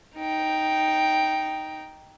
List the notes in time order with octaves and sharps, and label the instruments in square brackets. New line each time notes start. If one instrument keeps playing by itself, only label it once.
[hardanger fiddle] D#4 G5